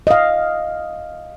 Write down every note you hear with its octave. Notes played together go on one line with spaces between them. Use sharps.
D#5 F5